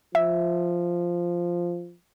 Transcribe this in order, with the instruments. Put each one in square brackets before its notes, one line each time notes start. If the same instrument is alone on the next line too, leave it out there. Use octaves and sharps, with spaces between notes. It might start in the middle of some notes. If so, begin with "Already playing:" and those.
[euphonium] F3 [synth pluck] E5